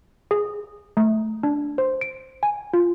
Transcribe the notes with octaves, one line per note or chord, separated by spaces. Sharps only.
G#4
A3
D4
C5
D7
G#5
F4